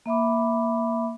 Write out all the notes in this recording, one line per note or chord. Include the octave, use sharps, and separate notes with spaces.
A#3 E5 B5 D6